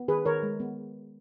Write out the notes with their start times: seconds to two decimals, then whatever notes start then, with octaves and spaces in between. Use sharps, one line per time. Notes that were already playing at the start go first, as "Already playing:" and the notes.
Already playing: B3
0.08 D#3 G#4 B4
0.25 D#3 A#4 C#5
0.43 G#3
0.60 B3